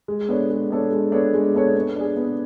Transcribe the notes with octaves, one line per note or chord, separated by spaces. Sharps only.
G#3
B3 D4 A4 C#5
G#3
B3 D4 A4 C#5
G#3
B3 D4 A4 C#5
G#3
B3 D4 A4 C#5
B3
D4 G#4
B3